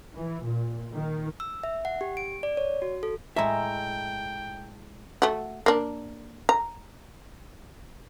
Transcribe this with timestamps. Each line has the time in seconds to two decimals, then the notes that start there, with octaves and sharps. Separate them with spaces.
0.16 E3
0.46 A#2
0.94 D#3
1.40 E6
1.63 E5
1.85 F#5
2.01 G4
2.17 D7
2.43 D5
2.57 C#5
2.82 F#4
3.03 A4
3.36 A2 G#3 E5 G5 A5 A#5 E6
5.22 A3 F#4
5.66 A#3 D4
6.49 A#5